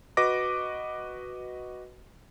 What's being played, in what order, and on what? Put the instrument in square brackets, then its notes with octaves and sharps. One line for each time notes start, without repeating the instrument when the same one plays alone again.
[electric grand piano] F#4 B4 D#5 D6 A#6